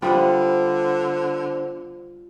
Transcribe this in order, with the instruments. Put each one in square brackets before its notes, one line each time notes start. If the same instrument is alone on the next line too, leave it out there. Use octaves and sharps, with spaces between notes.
[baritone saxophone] D3 [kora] G3 B3 F#5 [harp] F4 [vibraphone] C5